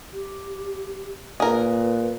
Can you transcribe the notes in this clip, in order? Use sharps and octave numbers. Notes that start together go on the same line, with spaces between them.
G4
A#2 G#4 A#4 B4